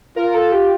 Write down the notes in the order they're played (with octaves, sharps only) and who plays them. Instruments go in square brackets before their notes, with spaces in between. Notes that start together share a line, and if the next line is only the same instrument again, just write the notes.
[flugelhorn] F4 [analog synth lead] A#4
[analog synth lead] A4
G4